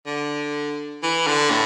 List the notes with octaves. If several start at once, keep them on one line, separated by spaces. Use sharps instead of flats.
D3
E3
D3
A2